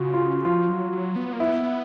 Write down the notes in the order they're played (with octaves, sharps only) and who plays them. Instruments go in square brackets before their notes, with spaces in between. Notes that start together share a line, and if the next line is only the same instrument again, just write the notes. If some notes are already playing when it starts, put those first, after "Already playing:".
Already playing: [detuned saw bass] C#3 [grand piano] F4 F#4
[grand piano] F4
[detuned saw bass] F3 [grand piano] F4
[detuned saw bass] F#3
F#3
B3
A#3
[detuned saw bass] B3 [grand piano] E4